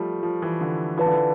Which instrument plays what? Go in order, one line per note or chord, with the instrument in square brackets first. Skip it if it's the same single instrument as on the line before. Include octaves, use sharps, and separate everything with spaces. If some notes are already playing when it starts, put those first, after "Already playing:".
Already playing: [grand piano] F3 G3 A3
F3
E3
D3
[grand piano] E3 [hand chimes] F4 B4 D5 A5
[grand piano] D3
E3